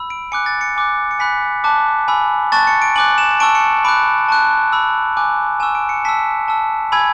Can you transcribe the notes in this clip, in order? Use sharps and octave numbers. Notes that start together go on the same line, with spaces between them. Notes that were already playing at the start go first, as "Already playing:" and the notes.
Already playing: B5 E6
D7
G#5 D6 F#6 C#7
A6
C#7
G#5 D6 F#6
C#7
G#5 B5 F#6 B6
A5 D6 F#6
G#5 B5 E6
A5 C#6 F#6 A6
C#7
D7
G#5 D6 F#6 F#7
E7
A5 C#6 E6 D7
C#7
B5 D6 F#6 D7
A5 C#6 F#6
B5 E6
G#5 D6 F#6
G#5 C#6 E6 E7
D7
C#7
A5 E6 B6
A5 E6
G#5 B5 E6 G#6